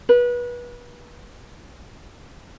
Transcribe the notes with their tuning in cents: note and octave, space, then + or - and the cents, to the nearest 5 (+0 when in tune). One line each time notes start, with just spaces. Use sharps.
B4 -30